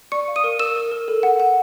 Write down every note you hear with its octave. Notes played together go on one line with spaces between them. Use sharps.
D5 C#6 C#7
F5
D#6 D#7
A#4
A#4 E6 E7
A#4
A#4
A4
F#5
F#5